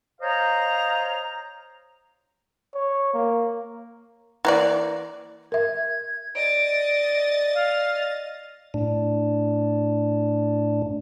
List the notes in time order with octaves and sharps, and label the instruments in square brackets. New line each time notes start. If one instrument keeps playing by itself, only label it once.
[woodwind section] C5 C#5 D#5 F5 A#5
[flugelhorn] C#5
A#3
[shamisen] E3 A#3 D5
[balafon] A#4 E5 [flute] G#6
[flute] D5 [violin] D#5 A6 [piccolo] D7
[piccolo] F5
[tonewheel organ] A2 D4